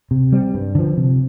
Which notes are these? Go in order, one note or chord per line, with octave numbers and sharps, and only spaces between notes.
C3
G3 C4
G2
D3 F3
C3